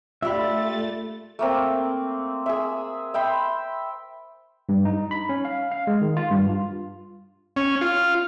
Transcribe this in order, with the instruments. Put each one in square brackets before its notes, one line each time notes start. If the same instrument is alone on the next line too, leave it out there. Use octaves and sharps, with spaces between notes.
[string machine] A3 A6 [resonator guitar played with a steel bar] D4 G4 [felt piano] F4 [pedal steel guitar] E5 B5
[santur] A3 A#3 C4
G#4 E5
E5 G5 B5 C6
[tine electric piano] G2
D#4
B5
C#4
F5
F5
G#3
D#3
F4
G2
F4
[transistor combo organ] C#4
F4